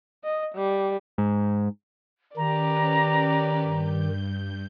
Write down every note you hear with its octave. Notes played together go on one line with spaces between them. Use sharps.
D#5
G3
G#2
D#3 C#4 G4 B4 D5 A#5
G2 G6